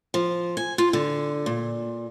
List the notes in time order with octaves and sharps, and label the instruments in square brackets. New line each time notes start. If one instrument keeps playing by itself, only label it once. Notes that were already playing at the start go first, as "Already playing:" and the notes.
[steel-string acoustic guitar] F3
G#5
F4
D3
A#2